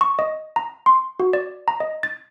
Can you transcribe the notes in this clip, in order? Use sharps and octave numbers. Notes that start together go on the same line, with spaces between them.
C#6
D#5
A#5
C6
F#4
D5
A#5
D#5
A6